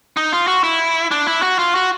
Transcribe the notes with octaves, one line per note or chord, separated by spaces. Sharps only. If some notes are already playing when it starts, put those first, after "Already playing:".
D#4
F4
F#4
E4
D4
E4
F#4
F4
F#4